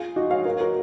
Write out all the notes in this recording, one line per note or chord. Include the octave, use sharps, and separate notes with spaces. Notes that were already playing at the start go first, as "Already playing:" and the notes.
Already playing: F4 G#4
D#4 F#4
C#5 F5
A#4 C#5
F#4 A#4